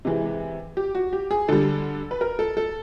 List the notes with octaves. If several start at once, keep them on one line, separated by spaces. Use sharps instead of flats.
C3 E3 G#3
G4
F#4
G4
G#4
D3 G3 A4
B4
A#4
A4
A4